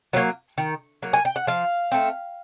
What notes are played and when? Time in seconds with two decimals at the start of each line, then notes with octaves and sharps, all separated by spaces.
0.13 F#3 A#3 C#5
0.58 D#3
1.03 F#3 A#3
1.13 G#5
1.25 G5
1.36 F#5
1.47 F3 F5
1.92 A3 C4